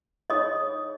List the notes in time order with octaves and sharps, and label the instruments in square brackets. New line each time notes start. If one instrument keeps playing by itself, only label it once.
[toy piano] D#4 G#4 C#5 D#5 D#6